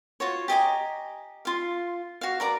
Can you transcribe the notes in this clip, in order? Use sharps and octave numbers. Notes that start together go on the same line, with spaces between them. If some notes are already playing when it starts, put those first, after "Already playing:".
F4 F#4 C#5
G4 D#5 G#5 A#5
F4 F5
F#4 F5
A#4 D5 A#5